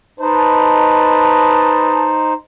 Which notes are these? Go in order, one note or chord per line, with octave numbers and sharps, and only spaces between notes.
D#4 B4 C5 D#5 A5